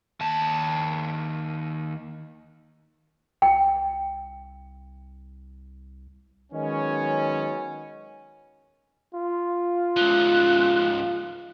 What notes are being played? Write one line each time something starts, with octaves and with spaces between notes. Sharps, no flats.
D#2 A5
C2 G5
D#3 F#3 G#3 B3 C#4
F4
C#2 F3 F#6